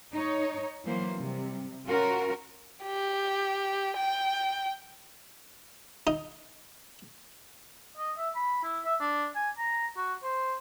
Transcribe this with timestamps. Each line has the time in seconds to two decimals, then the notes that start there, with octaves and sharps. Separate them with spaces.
0.14 D#4 C#5
0.84 E3 F#3 A#3 C5
1.17 C3 G3
1.86 C#4 F4 F#4 A#4
2.83 G4
3.96 G5
6.07 D#4
7.97 D#5
8.18 E5
8.35 B5
8.63 E4
8.85 E5
9.00 D4
9.35 G#5
9.58 A#5
9.97 F#4
10.23 C5